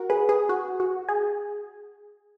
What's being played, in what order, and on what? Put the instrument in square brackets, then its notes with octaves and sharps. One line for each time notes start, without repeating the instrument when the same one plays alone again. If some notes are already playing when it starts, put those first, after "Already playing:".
Already playing: [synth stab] F#4 A#4
G#4 B4
G#4
F#4
F#4
G#4